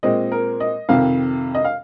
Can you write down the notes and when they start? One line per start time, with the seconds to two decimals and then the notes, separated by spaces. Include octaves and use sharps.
0.03 A#2 G#3 C4 D#5
0.32 A#4
0.60 D#5
0.89 F2 C3 D#3 F5
1.55 D#5
1.64 F5